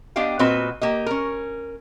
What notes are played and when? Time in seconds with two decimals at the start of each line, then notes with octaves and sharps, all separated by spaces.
0.16 B3 D4 G4 D#5 F5 G5
0.39 A#2 C4 F#4 B4 D#5
0.81 A#3 G4 D#5
1.06 C#4 A#4